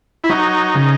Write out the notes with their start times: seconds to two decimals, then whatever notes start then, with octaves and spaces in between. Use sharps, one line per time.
0.24 E4
0.29 F#3 D#4
0.75 C#3